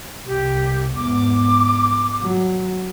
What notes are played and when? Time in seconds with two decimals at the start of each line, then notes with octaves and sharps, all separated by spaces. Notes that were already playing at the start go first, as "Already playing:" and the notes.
0.26 C2 G4
0.96 E2 G#2 D6
2.22 F#3